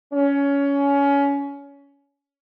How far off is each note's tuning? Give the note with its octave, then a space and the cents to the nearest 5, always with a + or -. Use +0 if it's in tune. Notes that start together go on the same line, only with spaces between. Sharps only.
C#4 +20